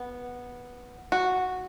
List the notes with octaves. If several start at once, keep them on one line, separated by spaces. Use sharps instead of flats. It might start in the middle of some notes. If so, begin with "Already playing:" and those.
Already playing: B3
F#4